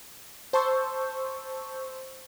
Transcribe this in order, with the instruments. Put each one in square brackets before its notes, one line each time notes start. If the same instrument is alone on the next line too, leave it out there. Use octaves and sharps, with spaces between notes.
[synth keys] C5 A5 C6 C#6 E6 G6